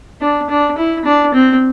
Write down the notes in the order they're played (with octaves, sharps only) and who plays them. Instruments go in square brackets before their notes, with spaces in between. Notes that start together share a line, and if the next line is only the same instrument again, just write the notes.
[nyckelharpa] D4
D4
E4
D4
C4